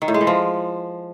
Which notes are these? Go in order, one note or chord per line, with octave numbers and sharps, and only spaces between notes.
D#3
A2
G#3
E3
F3